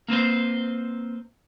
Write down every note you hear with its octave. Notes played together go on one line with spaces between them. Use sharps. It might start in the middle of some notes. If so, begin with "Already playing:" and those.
A#3 C4 B4 C5